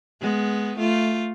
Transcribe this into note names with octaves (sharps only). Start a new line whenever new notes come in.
G#3 B3
A3 F4